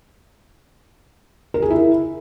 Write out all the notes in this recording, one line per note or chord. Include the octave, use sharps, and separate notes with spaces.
A#4
G#4
E4